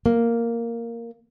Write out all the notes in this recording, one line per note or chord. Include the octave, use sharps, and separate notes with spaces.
A#3